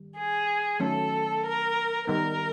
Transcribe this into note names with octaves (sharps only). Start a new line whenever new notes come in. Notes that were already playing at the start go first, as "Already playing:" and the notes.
Already playing: D#3 G3
G#4
D#3 F#3 A3 C#4 A4
A#4
D#3 G3 B3 D#4 A#4